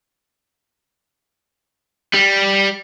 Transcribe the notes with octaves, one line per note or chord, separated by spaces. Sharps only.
G3